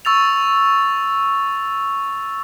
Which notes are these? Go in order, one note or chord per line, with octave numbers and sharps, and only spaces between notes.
C#6 E6 A6 F7